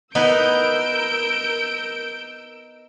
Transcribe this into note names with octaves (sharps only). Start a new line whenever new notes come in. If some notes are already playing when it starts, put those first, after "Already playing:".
B3 D#4 E4 A#4 E6 G6 D7